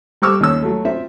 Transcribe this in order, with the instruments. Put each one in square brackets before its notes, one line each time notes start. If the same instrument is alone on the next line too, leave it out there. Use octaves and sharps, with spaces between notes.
[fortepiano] G3 C5 C#6 D6 E6 F6
D#2 C#4 E6
F#3 A3
C4 F4 E5